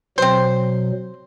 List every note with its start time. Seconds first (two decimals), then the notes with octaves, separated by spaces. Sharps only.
0.18 B2 F#3 C4 C5